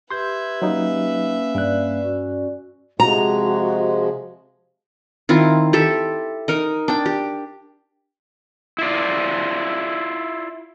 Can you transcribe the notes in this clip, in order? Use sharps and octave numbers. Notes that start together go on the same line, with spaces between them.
G4 B4 E5 C6 G6 G#6
F#3 A#3 C#4 D#4 F5
G2 D5 F#6
C#4 F#4
C3 F3 G#3 F#4 A#5
D#3 C4 E4 F4
G4 A4 E5
D#4 A#4 D#5
D4 G5
G4
E4 F4 D5